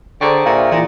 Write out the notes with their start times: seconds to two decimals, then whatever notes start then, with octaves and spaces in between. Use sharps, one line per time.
0.21 D3 G#4 C5 D5 G5 A#5 C#6
0.46 A#2 E5 F5
0.72 A#2 E3 E4 F4